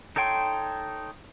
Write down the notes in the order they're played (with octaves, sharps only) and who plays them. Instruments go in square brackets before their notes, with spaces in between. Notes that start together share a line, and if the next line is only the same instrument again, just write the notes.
[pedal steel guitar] D#4 A4 C#5 G5 C6